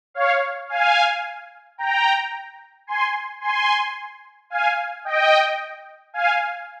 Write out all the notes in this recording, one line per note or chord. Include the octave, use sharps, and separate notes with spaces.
C#5 F5
F5 G#5
G5 A#5
G#5 C6
G#5 C6
F5 G#5
D#5 G5
F5 G#5